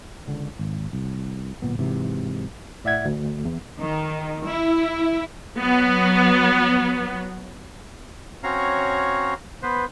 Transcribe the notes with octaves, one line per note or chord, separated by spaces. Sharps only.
C#2 D3
G#1
C2
D1 A#2 B3
G#2 C3 E3 F#3
A2 D5 E5 F#5 G#6
D2
E2
D#3
E4
F#3 B3
C4 C#4 F#4 C#5 F5 A#5
B3 B4 C5